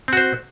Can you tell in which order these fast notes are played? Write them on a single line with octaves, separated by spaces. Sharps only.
C4 F#4 C5